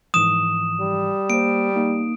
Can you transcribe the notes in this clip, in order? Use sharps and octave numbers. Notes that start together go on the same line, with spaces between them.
G#2 E3 F3 D#6 E7
G3
A#3 C5 D7
A#3 D#4